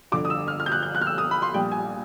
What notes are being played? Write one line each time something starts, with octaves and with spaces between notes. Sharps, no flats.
G1 F2 D3 D6
D#6
E6
F6
F6
G6
F#6
G6
F#6
F6
E6
D#6
B5
C6
A#1 A#2 G3 G5
G#5